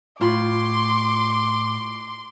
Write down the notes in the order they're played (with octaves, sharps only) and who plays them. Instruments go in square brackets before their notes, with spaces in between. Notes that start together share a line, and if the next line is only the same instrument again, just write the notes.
[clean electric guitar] A2 [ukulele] F4 B5 [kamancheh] C6 [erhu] D6